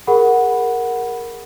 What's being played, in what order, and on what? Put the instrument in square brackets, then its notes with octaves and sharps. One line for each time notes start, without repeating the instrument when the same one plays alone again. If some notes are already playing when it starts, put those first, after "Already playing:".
[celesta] G#4 A#4 F#5 B5